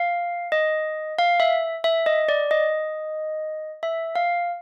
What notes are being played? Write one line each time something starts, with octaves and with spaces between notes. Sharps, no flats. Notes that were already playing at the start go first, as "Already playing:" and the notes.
Already playing: F5
D#5
F5
E5
E5
D#5
D5
D#5
E5
F5